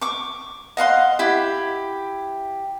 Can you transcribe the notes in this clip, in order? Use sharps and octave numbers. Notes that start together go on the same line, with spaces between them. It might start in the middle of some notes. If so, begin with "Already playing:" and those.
C#6 D6
D#5 F5 F#5 C6
E4 G4